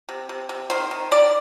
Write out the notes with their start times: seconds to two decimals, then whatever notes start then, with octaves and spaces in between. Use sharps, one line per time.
0.09 C3
0.29 C3
0.49 C3
0.70 D#3 C5
0.91 D#3
1.11 D#3 D5